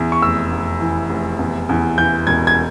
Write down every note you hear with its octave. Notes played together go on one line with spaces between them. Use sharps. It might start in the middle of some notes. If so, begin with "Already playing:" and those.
Already playing: E2
C#6
F1 E6
F1
E3
F1
E2
E2
E3 G6
E1 G#6
G#6